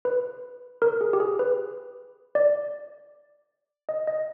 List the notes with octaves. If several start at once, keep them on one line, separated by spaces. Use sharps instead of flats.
B4
A#4
G#4
G4
G#4
B4
D5
D#5
D#5